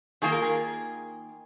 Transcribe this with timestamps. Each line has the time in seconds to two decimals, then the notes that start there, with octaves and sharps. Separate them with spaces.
0.22 D#3 A#3 F4 G#4
0.32 A#4
0.42 G#4